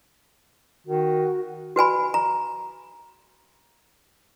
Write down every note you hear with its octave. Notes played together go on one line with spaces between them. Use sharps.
D#3 F#4
F#4 B4 G#5 B5
A#5